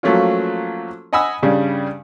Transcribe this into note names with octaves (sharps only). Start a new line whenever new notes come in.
F3 F#3 A3 A#3 C#4 F4
D#5 F#5 G#5 B5 D#6 E6
G2 C#3 G3